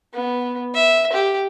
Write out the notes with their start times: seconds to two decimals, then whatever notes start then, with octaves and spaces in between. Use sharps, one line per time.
0.14 B3
0.74 E5
1.13 G4